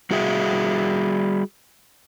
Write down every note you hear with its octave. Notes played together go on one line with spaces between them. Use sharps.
G3 F#4 G#4 E5